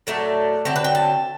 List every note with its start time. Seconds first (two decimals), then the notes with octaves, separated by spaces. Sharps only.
0.07 A2 F#3 A3 D4 A4
0.65 D3 F#3 C4 E4 G4
0.76 B4
0.84 G5
0.95 A5